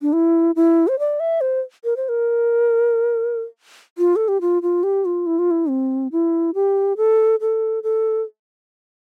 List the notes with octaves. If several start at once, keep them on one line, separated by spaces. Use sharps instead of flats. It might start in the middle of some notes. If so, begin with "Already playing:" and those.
D4
E4
E4
C5
D5
E5
C5
A#4
C5
A#4
F4
A4
G4
F4
F4
G4
F4
E4
F4
E4
C4
E4
G4
A4
A4
A4